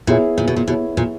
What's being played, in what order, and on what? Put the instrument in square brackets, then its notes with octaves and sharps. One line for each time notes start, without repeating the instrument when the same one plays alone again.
[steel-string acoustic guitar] A#2 [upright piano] B3 E4 G#4 C#5 E5
[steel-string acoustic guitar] A#2
B2
A#2
[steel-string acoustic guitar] B2 [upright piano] B3 E4 G#4 C#5 E5
[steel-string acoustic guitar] A#2